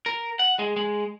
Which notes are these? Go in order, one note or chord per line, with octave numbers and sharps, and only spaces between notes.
A#4
F#5
G#3
G#3